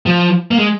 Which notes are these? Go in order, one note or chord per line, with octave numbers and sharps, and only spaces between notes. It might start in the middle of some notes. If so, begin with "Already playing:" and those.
F3
A#3
G#3